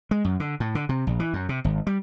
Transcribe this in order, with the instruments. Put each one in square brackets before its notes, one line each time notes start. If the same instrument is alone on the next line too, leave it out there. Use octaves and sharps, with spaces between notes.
[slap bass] G#3
F#2
D3
A2
D3
C3
A#1
E3
F#2
C3
G#1
G3